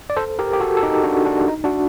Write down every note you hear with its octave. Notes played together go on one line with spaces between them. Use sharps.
D5
A4 C5
G4 A#4
G4
F#4 A4
A4
D#4 G4
D4 F#4
D4 F#4
D#4
D4 F#4